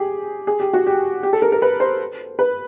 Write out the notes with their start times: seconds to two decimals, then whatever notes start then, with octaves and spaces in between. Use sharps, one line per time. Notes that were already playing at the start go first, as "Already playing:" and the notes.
Already playing: G4 G#4
0.47 G#4
0.60 G4
0.73 F#4
0.87 G4
1.23 G4
1.33 A4
1.42 A#4
1.52 A#4
1.62 B4
1.80 C5
2.39 B4